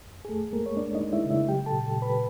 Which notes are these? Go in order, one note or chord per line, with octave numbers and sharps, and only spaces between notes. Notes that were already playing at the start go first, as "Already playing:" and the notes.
F2
G#4
F2 A3 A4
G#3 A#3 A#4
C#5
G#3 D4 D5
D#4 D#5
G#3
E4 E5
C#3
E4 E5
F#3 G4 G5
A4 A5
A#2
A#2
B4 B5